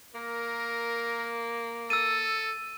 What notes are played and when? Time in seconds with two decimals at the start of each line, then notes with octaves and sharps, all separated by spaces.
0.15 A#3 A#4
1.90 A4 E6 D#7